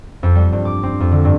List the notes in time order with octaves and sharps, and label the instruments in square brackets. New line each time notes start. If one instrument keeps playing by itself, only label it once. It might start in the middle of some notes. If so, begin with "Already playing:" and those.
[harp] F2
G3
G2
D6
C4
F2
D3
G2